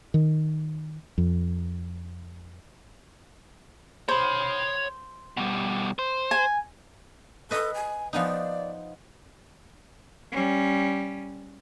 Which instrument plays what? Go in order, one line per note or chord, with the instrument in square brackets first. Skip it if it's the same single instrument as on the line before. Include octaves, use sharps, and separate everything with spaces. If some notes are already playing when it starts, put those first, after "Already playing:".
[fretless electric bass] D#3
F2
[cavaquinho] C5 [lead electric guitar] C#5 B5
[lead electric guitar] B2 G3
C5
[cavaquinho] G#5
[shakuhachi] A4 [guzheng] B4 D#5
[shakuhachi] G#5
[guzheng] F3 B3 D#4 [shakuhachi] D5
[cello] G3 C#4